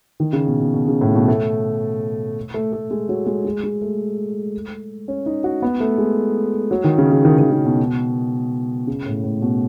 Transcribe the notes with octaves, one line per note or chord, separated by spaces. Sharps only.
D#3
C#3
B2
B2
B2
C#3
A2
B2
A3
A3
A3
G#3
F#3
G#3
G#3
G#3
A3
C#4
D#4
F#4
B3
A3
G#3
F#3
D#3
C#3
C#3
D#3
D#3
C#3
B2
C#3
A2
A2
B2